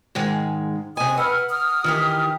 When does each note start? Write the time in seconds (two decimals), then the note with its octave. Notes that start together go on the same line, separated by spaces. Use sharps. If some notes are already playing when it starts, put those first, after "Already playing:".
0.15 G#2 D#3 G#3
0.97 C3 D#5 G#5 D#6
1.17 B4 F#5 E6 F6
1.50 D#6 F6
1.84 D#3 E3 G4